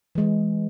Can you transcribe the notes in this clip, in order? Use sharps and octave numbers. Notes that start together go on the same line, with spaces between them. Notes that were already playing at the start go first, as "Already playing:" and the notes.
E3 G#3